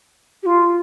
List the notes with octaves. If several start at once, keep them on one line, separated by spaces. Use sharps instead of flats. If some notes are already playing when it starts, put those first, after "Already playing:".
G4
F4